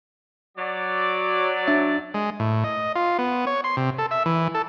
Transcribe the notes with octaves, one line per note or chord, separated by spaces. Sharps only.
F#3 D5
D4 E5 A6
G#3
A2
D#5
F4
B3
C#5
C6
C3
A4
E5
E3
A4